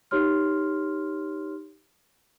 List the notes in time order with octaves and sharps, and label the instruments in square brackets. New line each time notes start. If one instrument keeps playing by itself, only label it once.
[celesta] D#4 G4 C#5 C6 F6